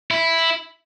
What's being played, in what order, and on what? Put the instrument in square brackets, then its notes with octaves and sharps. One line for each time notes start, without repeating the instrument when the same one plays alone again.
[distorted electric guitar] E4